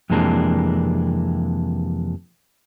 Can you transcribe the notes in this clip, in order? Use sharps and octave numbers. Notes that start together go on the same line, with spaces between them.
F2 C3 E3 G#3 A#3 D4